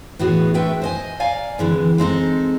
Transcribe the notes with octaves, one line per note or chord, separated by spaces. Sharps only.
A2 E3 B3 F#4 G#4
G#3 A3 D4 B4 E5 G5
C5 D#5 G#5
D5 F5 G#5 A#5
D3 E3 G#3 C4
G#3 C4 D#4 A4